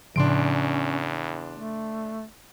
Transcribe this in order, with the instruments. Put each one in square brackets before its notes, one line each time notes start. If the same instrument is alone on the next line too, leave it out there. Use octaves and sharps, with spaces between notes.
[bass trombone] E2 [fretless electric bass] A2 C#3 F3 [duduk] C#4 [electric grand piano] D4 C6 D7
[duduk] A3